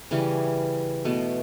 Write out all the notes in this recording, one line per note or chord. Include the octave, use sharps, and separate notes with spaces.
C#3 E3 G3 C#4
B2 A3 B3